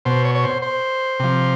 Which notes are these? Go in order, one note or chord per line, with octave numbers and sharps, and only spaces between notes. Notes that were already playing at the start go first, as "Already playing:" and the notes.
B2 C5
C#5
C#5
C5
C5
C3 F3